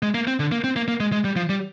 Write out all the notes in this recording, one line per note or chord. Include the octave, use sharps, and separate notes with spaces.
G#3
A#3
C4
D3
A#3
C4
A#3
A#3
G#3
G#3
G3
F3
G3